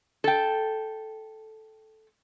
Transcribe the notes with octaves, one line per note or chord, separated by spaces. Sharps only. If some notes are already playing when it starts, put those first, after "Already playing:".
A4 G5